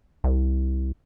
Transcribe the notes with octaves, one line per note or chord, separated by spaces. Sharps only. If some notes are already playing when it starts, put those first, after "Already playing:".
C2